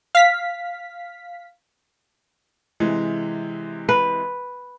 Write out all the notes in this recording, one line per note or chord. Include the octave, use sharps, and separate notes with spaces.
F5 B6
C3 E3 G#3
B4